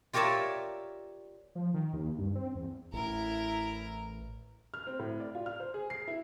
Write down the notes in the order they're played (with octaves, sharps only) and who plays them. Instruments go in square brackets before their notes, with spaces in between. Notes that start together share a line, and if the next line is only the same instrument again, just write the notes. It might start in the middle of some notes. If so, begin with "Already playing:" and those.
[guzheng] F4 G4 A#4 C#5 D5 E5
[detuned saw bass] F3
D#3
D#2
G2
C4
E2
[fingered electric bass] A1 [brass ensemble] E4 [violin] A#4 A#5
[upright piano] F6
C4
A2
D5
F4
F6
C5
G#4
C7
E4